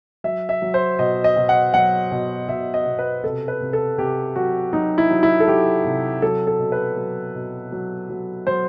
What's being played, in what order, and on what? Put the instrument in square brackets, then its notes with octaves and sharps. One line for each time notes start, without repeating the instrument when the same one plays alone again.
[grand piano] F#3 E5
E5
F#3
C5
B2 D#5
D#5
B2
F#5
F#3 F#5
B2
B2 E5
D#5
B2
B4
C3 A4
B4
C3
A4
C3 G4
F#3 F#4
F#3 D#4
E4
F#3
E4
A4
F#3 G4
C3
F#3 A4
A4
B2
B4
F#3
B2
F#3
F#3
F#3 C5